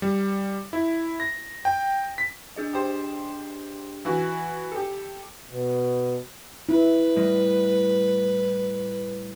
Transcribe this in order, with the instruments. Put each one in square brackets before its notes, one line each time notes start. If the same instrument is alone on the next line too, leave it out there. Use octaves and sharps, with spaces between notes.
[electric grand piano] G3
E4
A#6
G5
B6
[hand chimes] D4 G#4 D#5
[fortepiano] G4 C5
E3 F#4
G4 A4
[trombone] B2
[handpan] E4 [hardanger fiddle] B4
[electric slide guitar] A2 G3 D#5